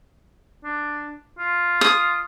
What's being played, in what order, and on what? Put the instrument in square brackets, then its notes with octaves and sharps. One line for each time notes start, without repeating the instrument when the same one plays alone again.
[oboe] D4
F4
[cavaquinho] D#6